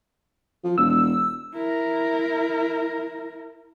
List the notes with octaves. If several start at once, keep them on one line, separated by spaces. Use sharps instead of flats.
F3
E1 E6
E4 A#4